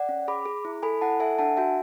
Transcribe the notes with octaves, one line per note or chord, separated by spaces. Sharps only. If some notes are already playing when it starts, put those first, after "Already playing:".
Already playing: D5 F#5
C#4
G#4 B5 D6
G#4
E4
A4 G#5 B5
E4 F#5 A5
A4 E5 G#5
D4 F#5 A5
F#4 E5 G#5